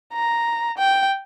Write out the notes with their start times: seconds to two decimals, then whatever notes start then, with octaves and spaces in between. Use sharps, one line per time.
0.13 A#5
0.78 G5